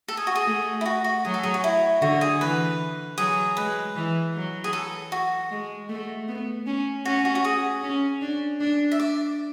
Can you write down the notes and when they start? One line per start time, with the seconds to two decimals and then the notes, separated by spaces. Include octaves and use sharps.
0.08 A4
0.17 G#4
0.27 F#4
0.36 G#4
0.47 A3
0.81 E4
0.86 F#4
1.04 F#4
1.25 F#3 G#4
1.34 A4
1.43 G#4
1.54 F#4
1.64 E4
2.01 D3 F#4
2.21 G#4
2.41 E3 B4
3.18 F#3 G#4
3.57 G#3 B4
3.96 E3
4.34 F#3
4.64 G#4
4.73 A4
5.12 F#4
5.51 G#3
5.89 A3
6.28 B3
6.67 C#4
7.05 C#4 F#4
7.25 F#4
7.35 F#4
7.45 G#4
7.83 C#4
8.22 D4
8.61 D4
8.92 E5
8.99 D5